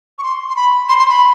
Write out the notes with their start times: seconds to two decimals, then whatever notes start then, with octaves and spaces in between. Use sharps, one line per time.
0.19 C#6
0.23 C6
0.49 C6
0.56 B5
0.89 C6
0.99 C6
1.09 B5